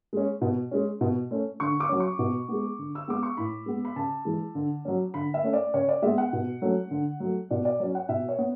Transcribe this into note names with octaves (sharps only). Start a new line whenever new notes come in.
G#3 C#4
B2
G#3 C#4
B2
A3 C#4
D3 C#6
D6
F#3 C#4
C#6
B2
G#3 B3
D3
E6
G#3 B3 D6
C#6
A2 B5
G#3 B3
B5
C#3 A5
E3 G#3
D3
F#3 C#4
D3 B5
E5
A3 C#4
D5
C#3 C#5
D5
G#3 B3 E5
F#5
B2
F#3 A3 C#4
D3
F#3 A3
B2 D5
D5
F#3 C#4 C#5
F#5
B2 E5
C#5
B3